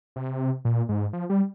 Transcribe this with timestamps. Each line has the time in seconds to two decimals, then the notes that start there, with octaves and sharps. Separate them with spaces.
0.16 C3
0.65 A#2
0.89 G#2
1.13 F3
1.30 G3